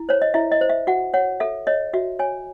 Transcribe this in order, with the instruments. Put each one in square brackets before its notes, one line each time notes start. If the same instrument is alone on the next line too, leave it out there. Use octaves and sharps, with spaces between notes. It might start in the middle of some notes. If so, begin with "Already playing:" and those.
Already playing: [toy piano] E4
C5 C#5
D#5
E4 E5
D#5
C5
E5
F#4 F#5
C#5 F#5
A4 E5
C#5 D#5
F#4 E5
C#5 G#5